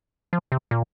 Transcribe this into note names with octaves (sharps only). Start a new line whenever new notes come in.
F3
C3
A#2